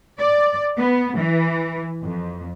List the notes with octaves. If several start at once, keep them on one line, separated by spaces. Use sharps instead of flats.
D5
B3
E3
F2